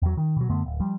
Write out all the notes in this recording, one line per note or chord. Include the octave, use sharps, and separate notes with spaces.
E2 F#3
D#3
B2 F#3
F#2 D3 A3 B3
D1
F3 G3